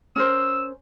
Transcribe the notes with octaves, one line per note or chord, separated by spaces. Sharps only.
C#4 A#4 C5 E6